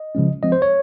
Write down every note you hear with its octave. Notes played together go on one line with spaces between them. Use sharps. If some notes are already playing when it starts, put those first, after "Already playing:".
Already playing: D#5
C#3 F3 G#3 C#4
F3 G#3 C4 D#5
C5
C#5